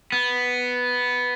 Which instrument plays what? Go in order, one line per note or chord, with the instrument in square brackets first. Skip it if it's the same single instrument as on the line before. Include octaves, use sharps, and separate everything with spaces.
[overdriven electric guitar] B3